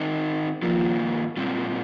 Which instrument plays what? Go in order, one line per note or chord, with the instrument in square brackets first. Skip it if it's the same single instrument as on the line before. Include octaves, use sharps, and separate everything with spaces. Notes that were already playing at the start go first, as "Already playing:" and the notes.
Already playing: [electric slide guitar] D#3 C4 D#4
[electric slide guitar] G2 D#3 A#3 F4 [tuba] F3
[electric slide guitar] A#2 G3 C4 F4